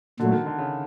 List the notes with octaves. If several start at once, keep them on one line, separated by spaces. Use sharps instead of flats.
A#2 D3 F#3 A3
D#3
D3
C#3